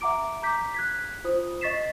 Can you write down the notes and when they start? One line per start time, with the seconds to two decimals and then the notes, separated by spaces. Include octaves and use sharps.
0.01 E5 F#5 A#5 D6 D7
0.42 A#5 D6 G6 B6
0.74 F#6 G#6 B6
1.24 F4 C5 D#6
1.61 D#5 C#6 A6 B6 C7 E7